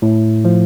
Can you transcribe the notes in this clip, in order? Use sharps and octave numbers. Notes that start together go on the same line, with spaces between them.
A2
F3